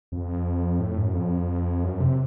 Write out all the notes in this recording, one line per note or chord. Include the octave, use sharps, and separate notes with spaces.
F2
A2
F#2
F2
F#2
C3